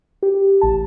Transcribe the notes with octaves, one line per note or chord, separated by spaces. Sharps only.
G4
A1 A5